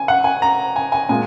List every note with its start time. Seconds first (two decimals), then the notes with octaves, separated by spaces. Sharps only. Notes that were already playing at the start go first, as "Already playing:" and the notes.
Already playing: G#5
0.08 F#5
0.24 G#5
0.42 A#5
0.76 G#5
0.92 G#5
1.09 A#2 G#3 G#5